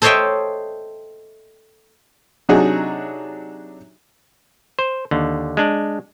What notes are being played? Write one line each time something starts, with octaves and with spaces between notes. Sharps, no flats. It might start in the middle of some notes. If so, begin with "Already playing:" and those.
A4 C5 C#5 D#5 E5 G5
C3 F#3 D4 D#4 F#4 G#4
C5
D#2 D3
G#3 D4